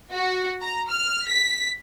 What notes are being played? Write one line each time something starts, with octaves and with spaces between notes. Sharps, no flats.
F#4
A#5
F6
B6